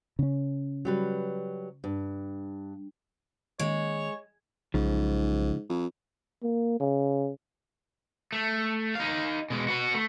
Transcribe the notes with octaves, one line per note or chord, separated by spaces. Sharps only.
C#3 C#4
F#3 G3 B4
G2
D#3 G#3 A#3 C#4 C#5
B1 G#2 C#3 F3
F2
A#3
C#3
A3
D#4 F5
B2 G#3
F#4 B4
A3